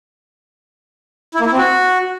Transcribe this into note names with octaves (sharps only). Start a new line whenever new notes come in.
E4
A#3
E4
C4
F#4